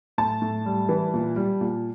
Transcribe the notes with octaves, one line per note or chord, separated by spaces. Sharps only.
A2 A5
A2
G3
E3
A#2
G3
A#2